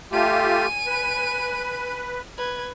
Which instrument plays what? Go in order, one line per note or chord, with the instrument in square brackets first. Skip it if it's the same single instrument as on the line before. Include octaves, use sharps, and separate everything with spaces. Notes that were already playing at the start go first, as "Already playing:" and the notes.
[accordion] A3 F4 G4 [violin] G#5 D#7
[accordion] B4
[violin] B4 G#6